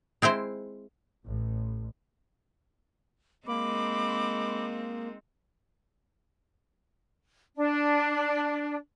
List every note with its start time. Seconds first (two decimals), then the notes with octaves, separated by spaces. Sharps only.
0.22 G#3 C4 E4 C5
1.25 A1
3.47 G#3 A#3 C4 D#4 B5 D6
7.56 D4